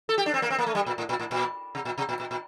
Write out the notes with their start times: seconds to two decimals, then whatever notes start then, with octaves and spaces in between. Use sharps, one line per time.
0.09 A4
0.18 G4
0.26 D4
0.34 C4
0.42 A#3
0.50 C4
0.59 A#3
0.66 A3
0.75 G3
0.86 A#2
0.98 A2
1.09 A#2
1.19 A2
1.31 A#2
1.75 C3
1.85 A#2
1.98 C3
2.09 A#2
2.20 A#2
2.31 A#2